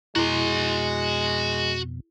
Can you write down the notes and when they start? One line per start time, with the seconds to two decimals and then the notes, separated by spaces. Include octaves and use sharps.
0.16 F2 B2 G#3 E4 F#4 G#4 C6